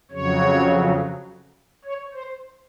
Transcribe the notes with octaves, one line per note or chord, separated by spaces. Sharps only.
F2 C#3 F#3 C#5
C#5
C5